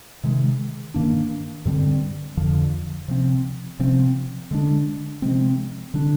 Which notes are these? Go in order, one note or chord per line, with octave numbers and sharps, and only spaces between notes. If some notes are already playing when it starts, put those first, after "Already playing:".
C3 D#3 G#3
G2 D#3 A#3 D4
G2 D3 G3 C4
F2 D3 F3
C3 F3 C4
C3 F3 C4
D3 G#3 D4
C3 F3 G#3 C4
D3 G3 D4